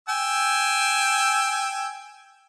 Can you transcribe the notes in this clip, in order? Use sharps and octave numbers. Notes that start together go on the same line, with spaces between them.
G5 G#5 E6